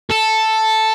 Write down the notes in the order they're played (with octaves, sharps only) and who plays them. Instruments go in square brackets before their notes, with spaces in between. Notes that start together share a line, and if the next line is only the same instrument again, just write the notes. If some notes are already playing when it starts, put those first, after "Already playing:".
[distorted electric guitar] A4